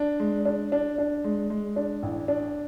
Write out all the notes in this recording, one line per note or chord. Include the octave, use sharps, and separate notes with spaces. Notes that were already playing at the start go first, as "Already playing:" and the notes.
Already playing: D4
G#3
D4
D4
D4
G#3
G#3
D4
A1
D4